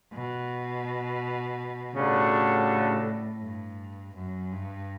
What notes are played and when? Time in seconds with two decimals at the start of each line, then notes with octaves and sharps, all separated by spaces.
0.13 B2
1.95 A2 C#3 G3 D4 F#4 A4
3.42 G2
4.15 F#2
4.52 G2